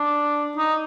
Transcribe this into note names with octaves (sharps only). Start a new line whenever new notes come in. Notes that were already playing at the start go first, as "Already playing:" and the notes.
Already playing: D4
D#4